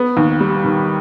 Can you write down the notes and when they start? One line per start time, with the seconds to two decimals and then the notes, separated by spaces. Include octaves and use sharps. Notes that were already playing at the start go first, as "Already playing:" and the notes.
Already playing: B3
0.17 D#2
0.40 G3
0.64 D#3